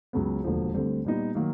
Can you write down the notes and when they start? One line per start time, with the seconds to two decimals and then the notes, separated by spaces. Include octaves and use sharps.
0.13 C#2 C#3 F#3 B3
0.44 E1 D#2 D3 F3
0.74 D2 D3 G3 C4
1.05 A#2 G3 B3 D#4
1.35 D#3 F#3 A#3